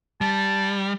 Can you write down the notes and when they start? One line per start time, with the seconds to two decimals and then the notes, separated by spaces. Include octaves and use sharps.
0.21 G3 A5